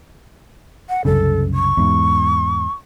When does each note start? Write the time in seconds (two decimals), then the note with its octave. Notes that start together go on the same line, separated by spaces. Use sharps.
0.89 F#5
1.05 C2 F#2 C#3 A4
1.54 C#6
1.77 E2 G#2